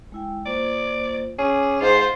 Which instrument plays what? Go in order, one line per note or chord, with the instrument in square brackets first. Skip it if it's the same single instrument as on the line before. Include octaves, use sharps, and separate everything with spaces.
[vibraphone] G#3 E4 G5
[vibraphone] A#3 F4 C5 [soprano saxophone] D5
[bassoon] C#4 [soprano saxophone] G#4 [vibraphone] D6
[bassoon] G#2 [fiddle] F4 C5